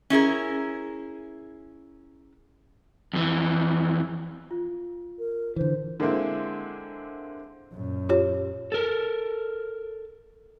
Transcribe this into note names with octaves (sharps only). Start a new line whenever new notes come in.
C#4 E4 G#4 A#4
F2 E3
F4
A#4
D3 E3 C5
D3 G#3 A#3 C4 E4
F#2 A#2
F4 G4 C#5
A4 A#4